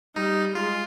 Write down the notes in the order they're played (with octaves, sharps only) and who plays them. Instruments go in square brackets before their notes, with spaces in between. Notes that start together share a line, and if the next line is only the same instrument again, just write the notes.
[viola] G3 [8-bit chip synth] D#4
[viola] G#3 [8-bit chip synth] F4